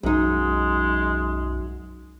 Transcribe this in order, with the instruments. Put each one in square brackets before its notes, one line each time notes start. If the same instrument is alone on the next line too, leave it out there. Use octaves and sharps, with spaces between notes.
[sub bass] B1 [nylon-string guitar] F#2 D#4 [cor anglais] G#3